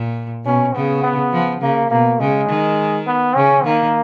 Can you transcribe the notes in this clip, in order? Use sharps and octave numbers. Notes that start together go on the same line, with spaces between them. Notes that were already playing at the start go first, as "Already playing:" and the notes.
Already playing: A#2
B2 C#4
C#3 B3
B3
F3
C#3 A#3
B2 A#3
C#3 G#3
D#3
B3
C#3 C#4
D#3 A#3